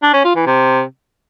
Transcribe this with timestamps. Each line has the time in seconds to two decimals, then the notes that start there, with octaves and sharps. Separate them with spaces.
0.02 D4
0.13 C#4
0.24 F4
0.35 E3
0.46 C3